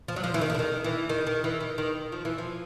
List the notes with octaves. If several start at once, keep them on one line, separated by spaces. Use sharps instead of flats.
F3
F#3
F3
E3
D#3
E3
D3
D#3
E3
D#3
D#3
E3
D#3
D#3
F3
E3
F3